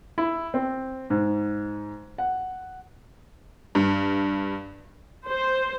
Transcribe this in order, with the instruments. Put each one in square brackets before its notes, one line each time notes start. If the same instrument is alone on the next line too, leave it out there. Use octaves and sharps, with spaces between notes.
[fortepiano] E4
C4
G#2
F#5
[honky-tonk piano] G2
[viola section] C5